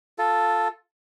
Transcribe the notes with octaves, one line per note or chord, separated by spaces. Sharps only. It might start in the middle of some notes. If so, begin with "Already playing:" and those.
F4 A4